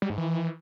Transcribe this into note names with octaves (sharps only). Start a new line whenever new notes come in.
G3
G#2
E3